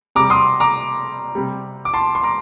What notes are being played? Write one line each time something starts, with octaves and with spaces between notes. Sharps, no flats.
C3 G3 A#5 D6
C6 D#6
A#5 D6
C3 G3
D6
A5 C6
C6
A#5 D6